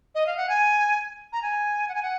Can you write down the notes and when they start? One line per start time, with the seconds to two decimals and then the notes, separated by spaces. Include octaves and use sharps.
0.15 D#5
0.27 F5
0.37 F#5
0.49 G#5
1.33 A#5
1.42 G#5
1.88 F#5
1.95 G#5
2.03 F#5